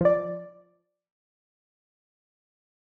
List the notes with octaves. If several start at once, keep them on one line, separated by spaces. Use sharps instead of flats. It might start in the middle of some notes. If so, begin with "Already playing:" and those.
F3 D5